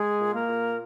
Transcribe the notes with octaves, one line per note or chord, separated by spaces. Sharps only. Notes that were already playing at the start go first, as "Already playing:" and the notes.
Already playing: G#3 G#4
A#2
A#3 A#4
A#2